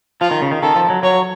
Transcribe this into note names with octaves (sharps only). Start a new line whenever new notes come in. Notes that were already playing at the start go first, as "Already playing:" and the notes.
F3 F4
D#3
C#3
D#3
D#3 A4
F3
F#3
F#3 C#5